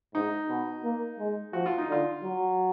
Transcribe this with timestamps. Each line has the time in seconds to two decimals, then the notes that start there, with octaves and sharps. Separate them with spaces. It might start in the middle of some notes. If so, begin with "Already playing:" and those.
0.14 G#2 D#4
0.49 B2
0.83 A#3
1.18 G#3
1.53 F3 F#4
1.66 F4
1.78 D#4
1.88 D3 F4
2.23 F#3